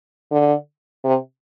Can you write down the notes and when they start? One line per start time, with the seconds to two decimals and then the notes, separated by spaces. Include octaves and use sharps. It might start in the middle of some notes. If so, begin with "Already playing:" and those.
0.31 D3
1.04 C3